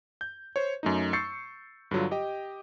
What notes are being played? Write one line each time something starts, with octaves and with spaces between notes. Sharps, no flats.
G6
C5 C#5
F#2 A3 D#4
C#6 E6 G6 A6 C7 C#7
G2 D3 F#3 F4
G4 D#5 G5